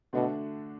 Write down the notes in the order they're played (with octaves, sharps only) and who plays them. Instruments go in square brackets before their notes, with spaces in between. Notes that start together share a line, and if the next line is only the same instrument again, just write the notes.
[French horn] B2 [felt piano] D3 A3 D4 F#4